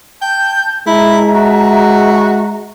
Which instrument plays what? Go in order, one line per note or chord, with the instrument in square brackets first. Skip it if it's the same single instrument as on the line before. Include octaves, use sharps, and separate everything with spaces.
[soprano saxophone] G5 [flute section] A5 G6
[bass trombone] G#3 [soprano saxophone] E4 [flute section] E5 A5 A#5
[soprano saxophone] F#4